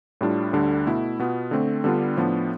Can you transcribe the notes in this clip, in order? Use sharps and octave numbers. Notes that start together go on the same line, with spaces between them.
A2 G3 D4 F4
D2 D3 G3 D4
B2 A3 E4
B2 B3 F4
D3 A3 C4
D3 G3 B3 D4 F4
A2 F3 B3 D4